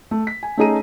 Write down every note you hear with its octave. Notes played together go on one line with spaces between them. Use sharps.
A3
B6
G#5
A3 C#4 D#4 G#4 A#5 D#7